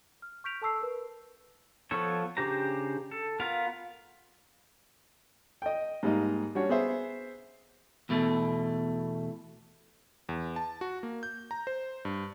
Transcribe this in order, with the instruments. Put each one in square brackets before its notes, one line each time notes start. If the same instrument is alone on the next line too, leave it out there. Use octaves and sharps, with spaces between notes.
[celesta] F6
C#6 F6 G6 B6 D7 F7
A4 A5 C#6 E6 C7
A#4 B4
[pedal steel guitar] F3 B3 A4 C#5
C#3 D4 G4 C5 A#5
A4
B3 F4 A#4 F5
[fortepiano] D#5 G5
G#2 G3 A#3 D#4 D#5
G3 C#4 D4 F#4 C#5
B3 G#4 C5 E5
[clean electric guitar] E2 B2 A3
[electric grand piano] E2
A5
F#4
A#3
G6
A#5
C5
G2